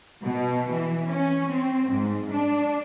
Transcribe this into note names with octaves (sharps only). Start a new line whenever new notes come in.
B2
E3
C#4
C4
G#2
D4